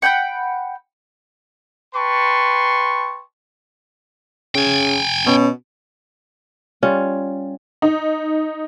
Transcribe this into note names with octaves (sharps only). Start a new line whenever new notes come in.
F#5 G5 B5 G6
B4 G5 A5 C6 C#6
C#3 G5 G#5
B2 C#4
G3 C#4 F4
D#4